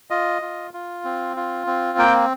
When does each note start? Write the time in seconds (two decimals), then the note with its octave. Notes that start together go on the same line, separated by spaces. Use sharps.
0.11 F4 D#5
0.42 F4
0.74 F4
1.04 C4
1.37 F4
1.67 C4
1.98 A#3 G5